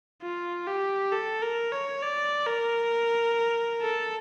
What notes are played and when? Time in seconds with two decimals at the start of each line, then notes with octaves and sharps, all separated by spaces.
0.22 F4
0.67 G4
1.12 A4
1.42 A#4
1.72 C#5
2.02 D5
2.47 A#4
3.81 A4